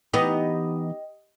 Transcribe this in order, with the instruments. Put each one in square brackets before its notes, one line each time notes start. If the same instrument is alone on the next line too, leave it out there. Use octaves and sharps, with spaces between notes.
[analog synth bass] E3 [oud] B3 D#4 [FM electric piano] G4 D#5